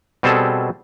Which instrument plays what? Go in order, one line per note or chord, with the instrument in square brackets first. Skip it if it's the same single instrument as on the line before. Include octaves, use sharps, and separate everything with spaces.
[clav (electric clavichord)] B2 G3 C4 G#4 A4